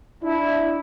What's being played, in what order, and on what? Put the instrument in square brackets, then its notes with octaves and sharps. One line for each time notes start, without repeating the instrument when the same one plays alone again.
[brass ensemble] D4 E4